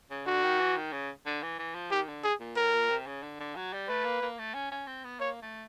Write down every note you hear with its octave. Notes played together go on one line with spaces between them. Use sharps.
C#3
D3 F#4
D#3
E3
D#3
C#3
D3
E3
E3
F3
D#3 G4
D3
G#4
A#2
A2 A#4
A#2
C3
C#3
D3
D3
F#3
G3
A3 B4
A#3
A#3
A3
C#4
C#4
C4
B3
A#3 C#5
A3